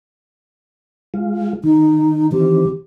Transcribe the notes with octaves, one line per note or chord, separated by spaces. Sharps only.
G#3 F4
D#3 D#4
D#3 E3 C4 G4